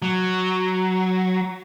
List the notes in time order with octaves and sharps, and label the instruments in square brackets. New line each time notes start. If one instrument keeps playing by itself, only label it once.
[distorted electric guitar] F#3